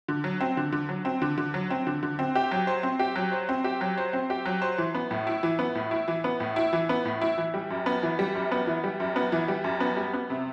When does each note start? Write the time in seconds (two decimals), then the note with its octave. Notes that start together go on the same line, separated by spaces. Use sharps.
0.08 D3
0.24 F#3
0.41 C4
0.57 D3
0.72 D3
0.89 F#3
1.05 C4
1.22 D3
1.38 D3
1.54 F#3
1.70 C4
1.87 D3
2.03 D3
2.19 C4
2.35 G4
2.51 F#3
2.67 C5
2.83 C4
2.99 G4
3.16 F#3
3.32 C5
3.49 C4
3.64 G4
3.81 F#3
3.98 C5
4.13 C4
4.30 G4
4.46 F#3
4.62 C5
4.78 E3
4.95 B3
5.11 A2
5.27 E4
5.43 E3
5.59 B3
5.75 A2
5.91 E4
6.08 E3
6.24 B3
6.40 A2
6.56 E4
6.73 E3
6.89 B3
7.05 A2
7.22 E4
7.38 E3
7.54 G3
7.70 F#2
7.86 B3
8.03 E3
8.19 G3
8.35 F#2
8.51 B3
8.67 E3
8.84 G3
9.00 F#2
9.16 B3
9.32 E3
9.48 G3
9.64 F#2
9.80 B3
9.97 G3
10.13 B3
10.30 C3